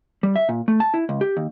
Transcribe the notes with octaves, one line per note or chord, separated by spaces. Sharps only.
G3
E5
A#2
A3
A5
E4
C#2
G4
D#2